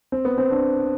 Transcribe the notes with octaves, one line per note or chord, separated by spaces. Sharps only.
C4
B3
C4
D4